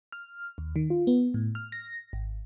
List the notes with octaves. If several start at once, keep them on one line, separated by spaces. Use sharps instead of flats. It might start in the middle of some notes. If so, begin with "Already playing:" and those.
F6
D#2
D#3
F4
B3
A2
F6
A#6
G#1